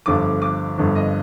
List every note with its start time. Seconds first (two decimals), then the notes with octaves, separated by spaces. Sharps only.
0.06 G1 G2 D3 F3 D6
0.42 D6
0.77 G1 G2 D3 F3
0.95 D#5